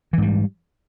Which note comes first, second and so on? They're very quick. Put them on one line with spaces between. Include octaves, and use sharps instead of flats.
E3 G#2 G3